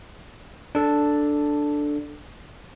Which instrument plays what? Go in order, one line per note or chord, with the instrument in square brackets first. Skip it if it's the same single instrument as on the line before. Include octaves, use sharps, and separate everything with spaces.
[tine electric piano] D4 A4